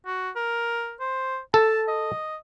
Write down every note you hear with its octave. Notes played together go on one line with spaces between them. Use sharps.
F#4
A#4
C5
A4 A5
D#5